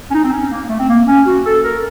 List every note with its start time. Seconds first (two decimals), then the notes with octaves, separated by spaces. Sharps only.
0.10 C#4
0.13 D#4
0.24 C4
0.32 C#4
0.51 A#3
0.69 A3
0.79 C4
0.88 A#3
1.07 C#4
1.26 F#4
1.45 A4
1.63 A#4